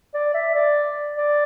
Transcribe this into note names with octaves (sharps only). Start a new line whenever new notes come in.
D5
E5
D5
D5